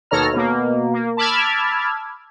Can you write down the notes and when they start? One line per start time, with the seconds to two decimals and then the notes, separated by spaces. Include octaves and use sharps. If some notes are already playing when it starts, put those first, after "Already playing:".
0.11 D#2 B2 A4 C#5 A#5 F6
0.34 B2 A#3
0.93 A#3
1.17 A5 B5 D6 E6 F6 G#6